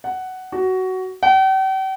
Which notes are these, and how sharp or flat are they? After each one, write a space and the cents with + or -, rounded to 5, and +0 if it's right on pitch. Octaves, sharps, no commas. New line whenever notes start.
F#5 +10
F#4 +15
G5 -45